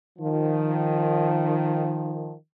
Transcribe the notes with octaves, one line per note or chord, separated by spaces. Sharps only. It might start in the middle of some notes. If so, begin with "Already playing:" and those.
D#3 F3